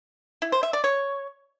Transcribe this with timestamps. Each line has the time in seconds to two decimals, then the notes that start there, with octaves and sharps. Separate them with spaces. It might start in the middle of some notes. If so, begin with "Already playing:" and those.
0.42 E4
0.52 C5
0.63 E5
0.73 D5
0.84 C#5